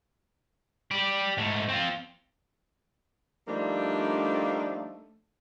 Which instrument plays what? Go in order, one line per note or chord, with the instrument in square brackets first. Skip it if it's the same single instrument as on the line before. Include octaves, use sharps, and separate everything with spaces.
[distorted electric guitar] G4 D5
G#2 A3
C4 F4
[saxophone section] F3 G3 A3 A#3 D4 D#4